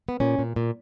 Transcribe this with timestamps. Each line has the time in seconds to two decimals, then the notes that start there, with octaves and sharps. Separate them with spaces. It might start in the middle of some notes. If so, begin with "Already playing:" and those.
0.09 B3
0.20 A#2 C#4
0.39 A#2
0.56 A#2